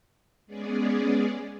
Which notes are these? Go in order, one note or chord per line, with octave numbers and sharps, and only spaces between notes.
G#3 B3 C#4 G#4 D5